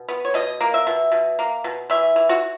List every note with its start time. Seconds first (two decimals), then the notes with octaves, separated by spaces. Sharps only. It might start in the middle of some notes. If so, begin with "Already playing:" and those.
Already playing: B2
0.09 B3
0.25 C#5
0.34 B2 D#5
0.61 A#3
0.74 E5
0.87 B2
1.12 B2
1.39 A#3
1.64 B2
1.90 E3 E5
2.16 E3
2.29 F#4